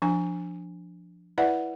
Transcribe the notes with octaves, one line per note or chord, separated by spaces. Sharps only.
F3 D4 G#5
E4 B4 D5 E5 F#5